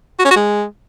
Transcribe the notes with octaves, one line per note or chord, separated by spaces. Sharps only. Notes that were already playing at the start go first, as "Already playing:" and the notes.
F#4
C#4
F#4
G#3